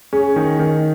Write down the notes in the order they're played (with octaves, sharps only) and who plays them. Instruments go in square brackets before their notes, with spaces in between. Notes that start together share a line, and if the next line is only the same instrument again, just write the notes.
[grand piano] C#4 [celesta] G#4
[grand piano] D#3
D#3